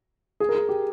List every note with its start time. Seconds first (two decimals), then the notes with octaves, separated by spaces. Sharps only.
0.40 G#4
0.49 A#4
0.55 G#4
0.69 G4